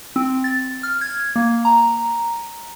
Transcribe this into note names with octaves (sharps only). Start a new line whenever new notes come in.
C4
A6
F6
G#6
A#3
A#5